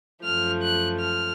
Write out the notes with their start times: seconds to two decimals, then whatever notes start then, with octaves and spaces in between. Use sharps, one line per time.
0.25 F#2 F3 A3 F6
0.62 F#6
1.00 F6